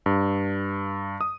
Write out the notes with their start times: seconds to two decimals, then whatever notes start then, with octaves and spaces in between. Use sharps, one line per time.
0.06 G2
1.21 D#6